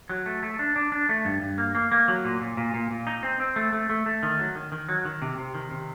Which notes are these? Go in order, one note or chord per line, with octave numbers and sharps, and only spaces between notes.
F#3
A3
A3
D4
D4
D4
A3
G2
G2
A#3
A#3
A#3
F#3
A#2
A#2
A#2
A#2
A#2
D#4
C4
C4
A3
A3
A3
A3
D#3
F#3
D#3
D#3
F#3
D#3
C3
C3
D#3
C3